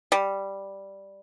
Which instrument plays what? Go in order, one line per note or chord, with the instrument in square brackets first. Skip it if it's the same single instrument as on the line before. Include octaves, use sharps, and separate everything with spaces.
[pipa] G3